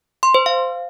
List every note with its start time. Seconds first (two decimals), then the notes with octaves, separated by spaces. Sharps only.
0.23 C6
0.34 C5
0.46 F5